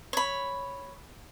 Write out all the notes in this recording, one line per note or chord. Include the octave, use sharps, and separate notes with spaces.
C#5 B5